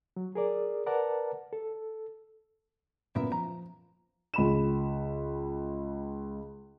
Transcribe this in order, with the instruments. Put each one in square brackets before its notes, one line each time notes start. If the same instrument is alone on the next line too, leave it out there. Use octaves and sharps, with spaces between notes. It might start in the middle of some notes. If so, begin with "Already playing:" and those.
[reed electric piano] F#3
G#4 A#4 D5
A#4 B4 D5 F#5 A5 A#5
A4
[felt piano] F#2 A#2 B3 [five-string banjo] E4 A#4 E5
[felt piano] F3 [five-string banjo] A#5
[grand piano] C#2 B5 E7